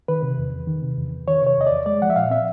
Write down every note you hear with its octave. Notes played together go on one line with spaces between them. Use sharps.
D#3 B4
C3
E2
E2
D#3
C3
E2
E2
D#3 C#5
C3 C#5
E2 D#5
E2 D5
G#3 D5
F3 F#5
E5
A#2 F5
C4 E5